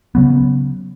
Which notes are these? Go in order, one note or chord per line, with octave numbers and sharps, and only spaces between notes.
C#3 F#3 B3